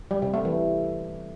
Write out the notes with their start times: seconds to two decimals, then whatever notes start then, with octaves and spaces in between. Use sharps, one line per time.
0.11 G3
0.22 C3
0.34 A3
0.45 E3